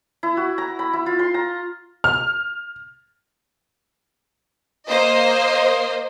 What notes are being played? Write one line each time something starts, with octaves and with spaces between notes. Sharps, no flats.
E4
F#4
A#5
B5
E4
F4
C6
A#5
F6
A#3 C5 D#5